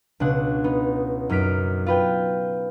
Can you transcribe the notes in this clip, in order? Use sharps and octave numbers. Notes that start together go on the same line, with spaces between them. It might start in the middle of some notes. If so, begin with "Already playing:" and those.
C#2 B2 D4 F#5
B3 D#4
F#2 D#4 F6 B6 D7
F4 B4 G5